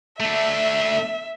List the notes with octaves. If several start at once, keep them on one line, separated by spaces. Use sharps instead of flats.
A3 D4 E5